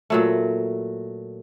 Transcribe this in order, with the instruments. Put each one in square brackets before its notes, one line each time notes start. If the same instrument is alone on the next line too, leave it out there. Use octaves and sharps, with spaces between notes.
[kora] A#2 F#3 A3